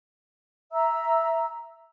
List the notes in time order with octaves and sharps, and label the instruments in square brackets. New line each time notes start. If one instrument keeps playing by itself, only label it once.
[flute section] E5 A#5 E6